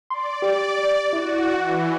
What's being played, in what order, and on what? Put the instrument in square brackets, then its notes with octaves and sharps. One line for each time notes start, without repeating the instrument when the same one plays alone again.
[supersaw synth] D5 [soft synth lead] C6
[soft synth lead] G4
[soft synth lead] E4 [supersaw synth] F#4
[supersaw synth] E3 [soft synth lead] F#5